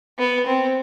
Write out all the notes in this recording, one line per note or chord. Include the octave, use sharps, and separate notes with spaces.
B3
C4